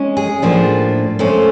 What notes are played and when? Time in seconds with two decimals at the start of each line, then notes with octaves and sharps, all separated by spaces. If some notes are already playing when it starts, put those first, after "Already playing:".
Already playing: G#3 C#4
0.17 G#4
0.42 A2 F3 A#3 D4
1.19 F3 A3 C#4